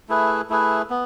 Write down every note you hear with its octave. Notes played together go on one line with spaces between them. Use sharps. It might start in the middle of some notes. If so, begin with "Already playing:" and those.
A3 E4 G#4 B4
A3 E4 G#4 B4
B3